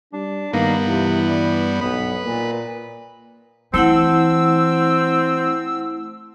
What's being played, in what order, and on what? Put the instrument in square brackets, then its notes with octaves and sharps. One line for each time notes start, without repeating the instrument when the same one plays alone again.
[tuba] G3 [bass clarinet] D4
[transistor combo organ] G2 B3 [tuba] D#3 [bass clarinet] A#3
[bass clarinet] C3 [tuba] E3
[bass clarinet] G3
[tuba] B1 [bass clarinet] B3 [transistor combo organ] B4
[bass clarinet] A#2 [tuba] A#3
[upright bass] E3 [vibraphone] A3 E4 F#5 [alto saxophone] C4 [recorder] E6